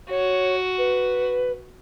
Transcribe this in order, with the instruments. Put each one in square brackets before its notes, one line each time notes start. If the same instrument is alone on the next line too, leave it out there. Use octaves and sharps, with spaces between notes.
[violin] F#4 [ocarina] C#5
[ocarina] B4